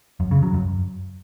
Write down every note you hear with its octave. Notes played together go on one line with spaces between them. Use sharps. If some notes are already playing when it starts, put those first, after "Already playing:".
F#2
C#3
F#3
F#2